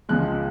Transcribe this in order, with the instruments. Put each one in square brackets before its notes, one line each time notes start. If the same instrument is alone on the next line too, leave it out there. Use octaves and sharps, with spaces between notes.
[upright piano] C#2 C#3 F3 G#3 F#6